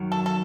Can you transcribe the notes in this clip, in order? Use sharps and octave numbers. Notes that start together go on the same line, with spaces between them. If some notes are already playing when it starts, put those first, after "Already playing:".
Already playing: F#2 D#3 F#3
A4
A4